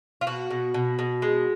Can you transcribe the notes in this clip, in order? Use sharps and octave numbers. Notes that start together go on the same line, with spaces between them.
F4
B2 F#4
B2
B2
B2
G#3